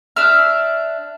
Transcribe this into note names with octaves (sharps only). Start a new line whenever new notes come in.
D4 E5 E6 F6